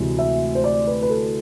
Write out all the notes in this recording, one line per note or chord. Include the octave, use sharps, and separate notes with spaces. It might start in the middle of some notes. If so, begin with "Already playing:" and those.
Already playing: D2 C3 E3 G#3
E5
C5
D5
B4
B4
A4